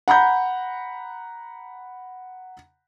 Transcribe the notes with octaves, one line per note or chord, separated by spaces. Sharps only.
F#5 A#5 B5 G6